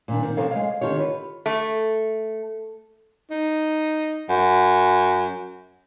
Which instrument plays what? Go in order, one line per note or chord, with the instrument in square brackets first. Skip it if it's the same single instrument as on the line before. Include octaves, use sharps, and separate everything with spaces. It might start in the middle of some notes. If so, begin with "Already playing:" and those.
[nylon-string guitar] A#2 D#3 D4
D#3 C4
C3 F3 A4 C#5 F5
G#3 C#5 F5
D3 D#3 F4 G4 C#5
B4
[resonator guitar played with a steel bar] A3
[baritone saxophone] D#4
F#2